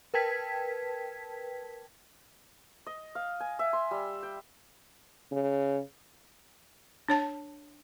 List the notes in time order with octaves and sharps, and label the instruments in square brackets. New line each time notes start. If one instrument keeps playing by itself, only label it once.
[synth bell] A#4 B4 G5 A5 G#6 B6
[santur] D#5
F5
G#5
E5
C6
G3
G5
[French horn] C#3
[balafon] D4 C#5 A5